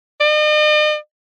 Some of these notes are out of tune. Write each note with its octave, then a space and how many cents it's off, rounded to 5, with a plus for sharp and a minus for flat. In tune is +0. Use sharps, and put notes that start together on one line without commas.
D#5 -45